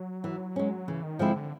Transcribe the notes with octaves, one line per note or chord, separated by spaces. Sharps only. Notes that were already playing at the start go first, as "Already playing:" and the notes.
Already playing: F#3
E3
G#3 C#4
C#3 E3
D#3
D3 F3 G#3 C4 E4
D3